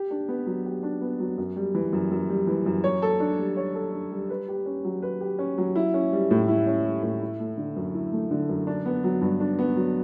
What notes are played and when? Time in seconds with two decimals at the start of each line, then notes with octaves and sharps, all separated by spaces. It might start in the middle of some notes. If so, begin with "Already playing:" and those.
Already playing: G4
0.11 D4
0.28 B3
0.47 F#3
0.65 G4
0.83 D4
1.01 B3
1.20 F#3
1.38 F#2
1.56 G3
1.75 E3
1.93 F#2
2.11 F#2
2.29 G3
2.47 E3
2.66 F#2
2.84 C#5
3.02 A4
3.20 D4
3.39 G3
3.57 C#5
3.75 A4
3.94 D4
4.12 G3
4.30 B4
4.48 G4
4.66 C#4
4.84 F#3
5.02 B4
5.21 G4
5.39 C#4
5.58 F#3
5.76 E4
5.94 C#4
6.12 G3
6.31 A2
6.48 E4
6.67 C#4
6.85 G3
7.03 A2
7.22 E4
7.40 A3
7.58 D3
7.76 F#2
7.94 E4
8.12 A3
8.31 D3
8.49 F#2
8.67 D4
8.86 B3
9.04 F#3
9.22 G2
9.40 D4
9.59 B3
9.76 F#3